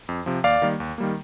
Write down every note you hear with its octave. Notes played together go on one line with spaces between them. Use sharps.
F2
C3 F3
D#2 D5 F5
D#3 G3 A#3
D#2
D#3 G3 A#3